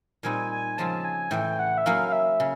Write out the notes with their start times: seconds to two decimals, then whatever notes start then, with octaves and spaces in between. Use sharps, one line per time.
0.23 A#2 G3 C4 D#4 G#5
0.51 G#5
0.78 C#3 F3 G#3 C4 A5
1.05 G#5
1.31 A2 E3 A3 G5
1.59 F#5
1.78 E5
1.86 F#3 A#3 C#4 E4 F5
2.08 F5
2.12 E5
2.40 C#3